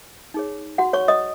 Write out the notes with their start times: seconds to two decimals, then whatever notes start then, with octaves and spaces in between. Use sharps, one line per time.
0.34 D#4 G#4 C#5
0.78 F#4 F#5
0.93 C#5 C#6
1.08 D#5 D#6